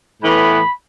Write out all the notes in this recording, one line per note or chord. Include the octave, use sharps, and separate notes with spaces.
A2 E3 B3 B5